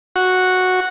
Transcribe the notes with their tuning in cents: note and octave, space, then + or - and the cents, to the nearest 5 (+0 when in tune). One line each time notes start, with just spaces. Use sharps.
F#4 -5